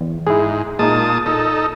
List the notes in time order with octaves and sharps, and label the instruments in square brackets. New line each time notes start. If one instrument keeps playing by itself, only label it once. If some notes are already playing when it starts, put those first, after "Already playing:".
[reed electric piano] E2
[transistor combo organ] G#2 [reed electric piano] E4 G#4
[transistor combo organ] A#2 A5 D#6 [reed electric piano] G#3 A#3 D#4
[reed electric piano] A#2 [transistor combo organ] D#4 A4